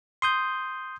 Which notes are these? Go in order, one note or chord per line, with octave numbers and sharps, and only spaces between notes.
C6 D#6 G6